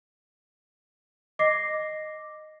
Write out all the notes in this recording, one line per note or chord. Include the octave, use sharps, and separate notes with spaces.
D#5 D6 A#6 C7